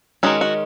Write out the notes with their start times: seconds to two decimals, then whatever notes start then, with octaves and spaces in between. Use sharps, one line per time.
0.23 D#3 G#3 C#4 F#4
0.41 F#4